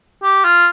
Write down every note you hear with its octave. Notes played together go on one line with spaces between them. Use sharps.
G4
F4